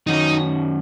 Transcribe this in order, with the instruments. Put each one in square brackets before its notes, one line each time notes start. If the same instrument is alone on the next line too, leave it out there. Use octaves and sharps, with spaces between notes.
[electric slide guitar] F#2 D#3 F#3 C#4 F#4 [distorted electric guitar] D#4